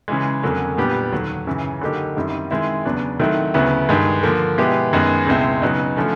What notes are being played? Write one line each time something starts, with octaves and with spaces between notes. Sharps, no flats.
C#3 E3 G#3
F2 D3 F#3 A#3 C#4
A#2 G3 B3 D4 G4
D#2 D3 F#3
F#2 C#3 E3
D3 F#3 A#3 D#4 G4
F#2 D#3 G3 C4 E4
D#3 G#3 C4 E4
E2 C#3 F#3 B3 D4
D#3 F#3 A3 C4 E4
D2 C#3 F#3 B3 E4
G2 D#3 G#3
D3 F3 A#3
B2 G#3 B3 E4 G4
F#2 D#3 G#3 B3
C#2 B2 G#3 C4 E4
C#3 F#3 B3 D#4
D3 F3 A3 C#4